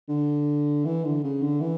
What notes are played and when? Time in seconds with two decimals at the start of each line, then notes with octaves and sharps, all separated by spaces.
0.08 D3
0.85 E3
1.05 D3
1.23 C#3
1.42 D3
1.61 E3